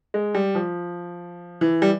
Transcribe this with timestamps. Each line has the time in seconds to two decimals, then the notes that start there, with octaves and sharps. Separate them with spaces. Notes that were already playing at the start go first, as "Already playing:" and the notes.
0.14 G#3
0.34 G3
0.55 F3
1.61 E3
1.82 G3